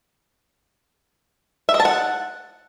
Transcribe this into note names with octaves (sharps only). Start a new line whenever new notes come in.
E5
D#5
A5
F#5